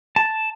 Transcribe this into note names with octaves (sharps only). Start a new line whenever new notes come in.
A5